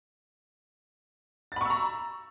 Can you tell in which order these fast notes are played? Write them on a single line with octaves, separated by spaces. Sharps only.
A6 B5 C#6 E6 A#5